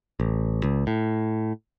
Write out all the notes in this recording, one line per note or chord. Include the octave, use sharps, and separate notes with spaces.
A1
C#2
A2